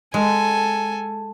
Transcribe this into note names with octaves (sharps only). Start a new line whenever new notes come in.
G#3 A4 G#5